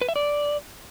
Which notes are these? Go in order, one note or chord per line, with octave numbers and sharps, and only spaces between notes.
B4
E5
D5